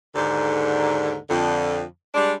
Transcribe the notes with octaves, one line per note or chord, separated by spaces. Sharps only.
D#2 G#2 D3
F2 D3
G3 G#3 D4